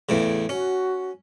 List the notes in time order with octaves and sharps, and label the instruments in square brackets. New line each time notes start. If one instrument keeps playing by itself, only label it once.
[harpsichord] E2 A2 C#3
[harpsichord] C#4 [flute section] F#4